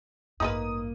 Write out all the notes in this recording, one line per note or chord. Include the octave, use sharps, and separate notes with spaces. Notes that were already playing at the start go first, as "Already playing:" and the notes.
A1 G2 A#3 D#4 F4 B4 D#6 D#7